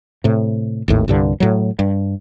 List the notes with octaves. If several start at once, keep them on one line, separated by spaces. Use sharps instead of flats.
A2 C3
G#1 D#2 A2
C2 G2 D3
A2 F#3
G2